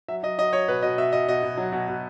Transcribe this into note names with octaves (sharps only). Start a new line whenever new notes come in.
F#3 E5
F#3 D#5
F#3 D#5
F#3 C#5
B2 B4
B2 D#5
B2 E5
B2 D#5
B2 D#5
B2
F#3
B2
B2